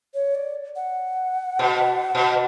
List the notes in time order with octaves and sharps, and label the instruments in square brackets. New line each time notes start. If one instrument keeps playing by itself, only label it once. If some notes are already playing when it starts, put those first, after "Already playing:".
[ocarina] C#5
D5
F#5
[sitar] B2
B2